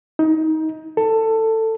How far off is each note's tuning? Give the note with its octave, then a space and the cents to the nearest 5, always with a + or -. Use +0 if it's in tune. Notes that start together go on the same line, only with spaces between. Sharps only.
D#4 +25
A4 +15